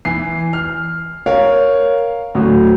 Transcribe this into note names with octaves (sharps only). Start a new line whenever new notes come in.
E3 C7
F6
A#4 C#5 F5
D2 A2 F#3